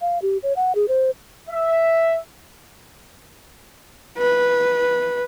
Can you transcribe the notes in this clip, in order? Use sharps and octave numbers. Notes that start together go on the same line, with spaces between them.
F5
G4
C#5
F#5
G#4
C5
E5
B4